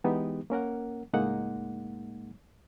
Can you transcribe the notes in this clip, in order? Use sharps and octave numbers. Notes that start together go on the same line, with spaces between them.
E3 G#3 B3 D#4 G4
A#3 C#4 A#4 F#5
C#2 A2 G#3 A#3 D#4 F#5